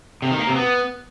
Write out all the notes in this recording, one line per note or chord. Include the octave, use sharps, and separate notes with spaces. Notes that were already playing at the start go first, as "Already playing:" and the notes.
C3
D#3
A#3
C3
B3